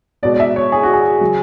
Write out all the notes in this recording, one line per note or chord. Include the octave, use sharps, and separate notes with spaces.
B2 G#3 B3 D5
D5
E5
C#5
G#4
F#4
G#4
C#3 F#3